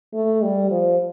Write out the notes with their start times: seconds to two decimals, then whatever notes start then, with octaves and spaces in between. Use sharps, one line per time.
0.14 A3
0.43 G3
0.71 F3